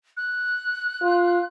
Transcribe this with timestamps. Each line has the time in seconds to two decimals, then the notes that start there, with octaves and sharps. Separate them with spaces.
0.17 F#6
1.02 F4